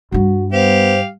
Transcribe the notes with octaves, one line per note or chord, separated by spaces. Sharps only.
G2 G3 F#4
B3 G4 C5 F5